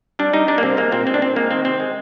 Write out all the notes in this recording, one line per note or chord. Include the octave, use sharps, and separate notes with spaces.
G3 D4
G3 D#4
G3 D4
A#3
C3 C4
G#3 A#3
A#2 C4
G#3 C4
D4
A#2 C4
G#3 A#3
D#3 C4
C3 C4
G#3